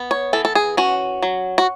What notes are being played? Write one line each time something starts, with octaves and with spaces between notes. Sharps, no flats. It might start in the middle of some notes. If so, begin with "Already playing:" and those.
Already playing: B3
C#5
E3 A4
A4
G#4
C#4 F#4
F#3
F#4